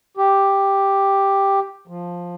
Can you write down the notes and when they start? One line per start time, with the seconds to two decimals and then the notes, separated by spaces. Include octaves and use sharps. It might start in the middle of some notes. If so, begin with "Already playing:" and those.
0.17 G4
1.88 F3